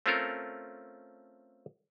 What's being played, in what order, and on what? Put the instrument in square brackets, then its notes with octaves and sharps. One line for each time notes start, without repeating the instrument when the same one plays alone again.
[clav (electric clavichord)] A3 C4 C#4 F4 A4 A#4